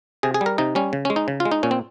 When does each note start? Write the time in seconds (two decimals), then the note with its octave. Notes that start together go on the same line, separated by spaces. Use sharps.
0.23 C3 G#4
0.34 G#4
0.41 G3
0.46 A#4
0.58 C3 D#4
0.75 G3 C#4
0.93 C#3
1.05 G#3 C#4
1.16 D#4
1.28 C#3
1.40 F4
1.45 G#3
1.52 D#4
1.63 A#2 C#4
1.71 C4